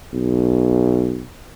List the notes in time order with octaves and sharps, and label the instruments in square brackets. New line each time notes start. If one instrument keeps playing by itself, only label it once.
[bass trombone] B1